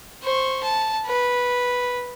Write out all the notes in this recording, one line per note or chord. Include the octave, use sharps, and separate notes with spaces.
C5 C#6
A5
B4